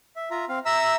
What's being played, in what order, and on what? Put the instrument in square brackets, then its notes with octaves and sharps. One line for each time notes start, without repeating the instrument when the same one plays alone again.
[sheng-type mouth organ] E5
F4 E5 A#5
C4 F5
E5 A#5 E6